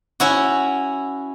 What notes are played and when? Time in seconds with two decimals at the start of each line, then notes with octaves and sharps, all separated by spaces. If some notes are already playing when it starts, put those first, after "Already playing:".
0.20 C#4 E4 F#4